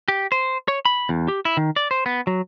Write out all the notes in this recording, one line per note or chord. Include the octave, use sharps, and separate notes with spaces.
G4
C5
C#5
B5
E2
G4
E4
D#3
D5
C5
B3
F#3